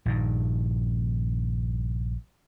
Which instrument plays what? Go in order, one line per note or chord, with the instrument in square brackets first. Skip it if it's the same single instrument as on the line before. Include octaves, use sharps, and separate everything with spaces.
[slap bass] A#1 G2 D#3